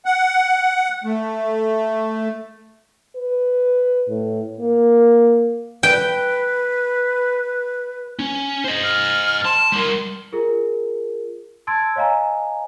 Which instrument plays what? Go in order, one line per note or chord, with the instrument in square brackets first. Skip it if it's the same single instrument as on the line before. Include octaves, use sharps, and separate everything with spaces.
[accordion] F#5
A3
[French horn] B4
A2
A#3
[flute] B4 [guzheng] G5
[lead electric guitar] C#4
C5 D#5
[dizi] F6
[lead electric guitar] A5 [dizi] C6
[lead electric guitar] G3 A#4
[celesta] F4 G#4 A#4
A5 C6 E6 G#6 A6 D7
C#5 D#5 F5 G#5 A#5